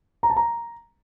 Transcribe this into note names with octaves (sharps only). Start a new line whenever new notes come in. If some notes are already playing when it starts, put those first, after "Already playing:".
A#5
A5
A#5